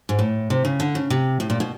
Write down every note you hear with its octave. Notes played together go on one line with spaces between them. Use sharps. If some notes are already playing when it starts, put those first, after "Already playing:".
G#2
A2
C3
C#3
D3
C#3
C3
A2
A#2
B2